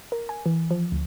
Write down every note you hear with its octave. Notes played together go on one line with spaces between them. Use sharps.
A#4
G#5
E3
F3
D2